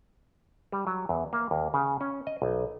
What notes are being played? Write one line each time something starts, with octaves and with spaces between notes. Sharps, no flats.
G3
F#3
E2
A#3
D#2
C#3
C#4
D#5
B1